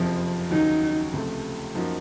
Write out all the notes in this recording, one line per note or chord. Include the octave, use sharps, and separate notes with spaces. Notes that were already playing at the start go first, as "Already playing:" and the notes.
Already playing: F#1 F2 C3 F3
D#2 C#3 F#3 D#4
C#2 C3 F3 A3
F#2 F3 A#3 D#4 F#4